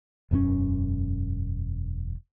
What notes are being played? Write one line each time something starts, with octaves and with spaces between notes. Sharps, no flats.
E1 F#2 G#3 C#4